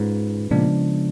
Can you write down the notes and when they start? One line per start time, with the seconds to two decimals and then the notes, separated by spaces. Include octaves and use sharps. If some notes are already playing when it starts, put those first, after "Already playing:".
Already playing: G#2 G#3 C#4 F4 G#4 B4
0.51 A#2 C#3 F3 G#3 B3 D4